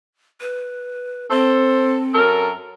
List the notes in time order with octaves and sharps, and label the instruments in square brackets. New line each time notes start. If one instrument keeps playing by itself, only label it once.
[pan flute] B4
[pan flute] C4 [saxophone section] A4 C5
[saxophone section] F#2 A4 A#4